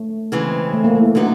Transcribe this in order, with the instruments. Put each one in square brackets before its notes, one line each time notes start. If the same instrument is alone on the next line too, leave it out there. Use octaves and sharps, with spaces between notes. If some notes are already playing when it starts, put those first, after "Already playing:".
Already playing: [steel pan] A3
[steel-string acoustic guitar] C#3 E3 G#3 C4
[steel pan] A3
A#3
A3
[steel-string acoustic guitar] D3 F#3 B3 D#4 G4